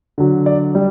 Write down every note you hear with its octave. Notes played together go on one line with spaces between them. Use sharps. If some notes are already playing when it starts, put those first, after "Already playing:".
D3 F#3
D5
G3 D5